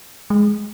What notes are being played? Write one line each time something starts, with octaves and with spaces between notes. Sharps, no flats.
G#3